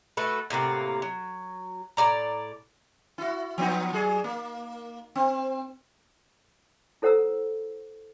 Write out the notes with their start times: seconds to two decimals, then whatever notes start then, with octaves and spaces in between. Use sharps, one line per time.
0.17 A3 F#4 A4 B4
0.50 A2 C3 A#3 F#5
1.02 F#3
1.97 A2 G3 D5 A#5
3.18 E4 F#4
3.58 F3 B3 D#4
3.93 F#3 G#4
4.24 A#3
5.15 C4
7.02 E4 A4 C5 F#5 A#5 E6